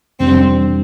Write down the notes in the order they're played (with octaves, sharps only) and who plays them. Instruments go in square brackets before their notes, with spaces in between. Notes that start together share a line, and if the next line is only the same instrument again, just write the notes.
[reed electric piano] F2 C3 E3 G3 D4 [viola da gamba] C4